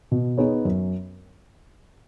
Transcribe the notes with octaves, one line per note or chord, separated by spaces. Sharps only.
B2
B3 D#4 G#4 C#5
F#2